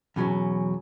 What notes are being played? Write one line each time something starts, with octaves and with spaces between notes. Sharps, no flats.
E2 B2 F#3 C#4